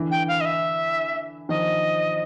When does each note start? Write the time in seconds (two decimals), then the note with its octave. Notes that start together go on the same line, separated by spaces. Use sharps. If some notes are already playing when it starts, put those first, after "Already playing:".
Already playing: D3 E3
0.11 G5
0.28 F5
0.41 D#5
0.45 E5
1.49 D#3 F3 D#5